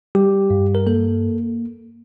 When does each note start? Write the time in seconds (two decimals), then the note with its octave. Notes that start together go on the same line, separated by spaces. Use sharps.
0.15 G3 G4
0.50 G2
0.75 A#4
0.86 A#3 A4